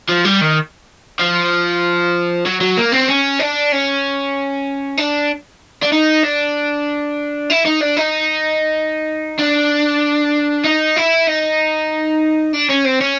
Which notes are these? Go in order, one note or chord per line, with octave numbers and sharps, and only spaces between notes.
F3
G3
D#3
F3
F#3
F#3
A#3
C4
C#4
D4
C#4
D4
D4
D#4
D4
E4
D#4
D4
D#4
D4
D#4
E4
D#4
D4
C#4
C4
C#4